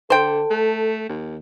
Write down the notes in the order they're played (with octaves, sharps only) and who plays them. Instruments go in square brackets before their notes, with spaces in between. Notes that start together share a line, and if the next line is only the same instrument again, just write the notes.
[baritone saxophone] D3 [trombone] A4 [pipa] C5 G5
[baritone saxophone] A3
D#2